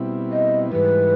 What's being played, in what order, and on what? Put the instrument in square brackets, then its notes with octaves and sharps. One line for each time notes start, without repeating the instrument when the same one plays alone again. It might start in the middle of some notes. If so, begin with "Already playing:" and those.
Already playing: [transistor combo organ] B2 G3 C4 E4
[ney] D#5
[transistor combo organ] G#2 E3 G3 [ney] B4